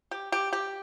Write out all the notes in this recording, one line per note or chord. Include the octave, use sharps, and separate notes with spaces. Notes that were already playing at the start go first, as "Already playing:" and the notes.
G4
G4
G4